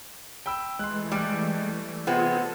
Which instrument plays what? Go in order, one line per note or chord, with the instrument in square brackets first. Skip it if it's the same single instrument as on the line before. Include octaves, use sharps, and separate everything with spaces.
[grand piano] G5 B5 E6
[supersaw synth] E3 A3 [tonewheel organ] G#3 [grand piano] C6 F#6
[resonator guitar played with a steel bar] G3 [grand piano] D6 F#6
[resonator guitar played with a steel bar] C3 B3 C4 [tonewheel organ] F4 G#4 [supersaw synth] A4